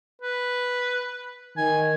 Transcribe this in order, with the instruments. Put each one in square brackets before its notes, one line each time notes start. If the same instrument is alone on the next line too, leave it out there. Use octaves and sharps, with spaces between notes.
[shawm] B4
[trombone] D#3 [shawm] G#5